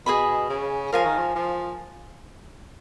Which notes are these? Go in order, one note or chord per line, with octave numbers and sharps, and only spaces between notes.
B2 G#4 D#5 G#5 B5
C#3
F3 A#4 F5 G#5
D#3
F3
F3